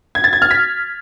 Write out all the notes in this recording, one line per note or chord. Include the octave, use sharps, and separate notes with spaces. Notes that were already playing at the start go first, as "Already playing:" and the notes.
G#6
A6
G#6
F6
B6